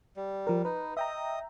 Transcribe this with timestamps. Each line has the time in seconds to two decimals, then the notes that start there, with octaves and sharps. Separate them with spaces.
0.16 G3
0.47 F3 A#4
0.65 D#4 B4
0.97 D#5 E5 G5 A#5